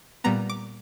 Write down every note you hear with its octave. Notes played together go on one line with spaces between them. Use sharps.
A#2 G3 B3 A#5
D6